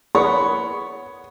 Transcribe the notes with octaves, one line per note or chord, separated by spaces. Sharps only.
A#3 B3 G#4 A#4 C#5 C#6